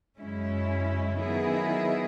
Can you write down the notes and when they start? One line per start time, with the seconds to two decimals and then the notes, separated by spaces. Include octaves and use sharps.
0.18 F#2 C#3 G#3 C#4 E4
1.18 D#3 F#3 B3 E4 G#4